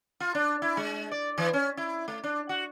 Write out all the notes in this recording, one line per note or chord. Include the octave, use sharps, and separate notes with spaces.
F4
D4
E4
G#3
D5
E3
C#4
E4
A3
D4
F#4